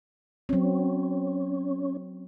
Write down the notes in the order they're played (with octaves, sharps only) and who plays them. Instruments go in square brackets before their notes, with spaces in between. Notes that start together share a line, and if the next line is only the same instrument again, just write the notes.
[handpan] F#3 C4 [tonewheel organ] C#4